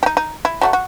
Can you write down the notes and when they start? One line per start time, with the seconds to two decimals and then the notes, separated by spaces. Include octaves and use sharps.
0.03 D#4 G4
0.17 D#4
0.45 E4
0.62 F#3 A3 F#4
0.73 F#4